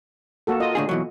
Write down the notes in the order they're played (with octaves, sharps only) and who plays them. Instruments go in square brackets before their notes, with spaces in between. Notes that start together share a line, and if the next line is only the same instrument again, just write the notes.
[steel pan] A#3 F#4 A4
F4 D#5
[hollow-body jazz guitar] A2 D3 G#4
B2 E3 F#3